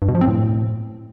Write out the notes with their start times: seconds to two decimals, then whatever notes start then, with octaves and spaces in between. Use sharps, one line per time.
0.02 G2
0.08 B2
0.15 F3
0.21 C4
0.28 A2